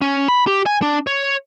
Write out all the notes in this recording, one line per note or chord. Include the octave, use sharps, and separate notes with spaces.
C#4
B5
G4
G#5
D4
C#5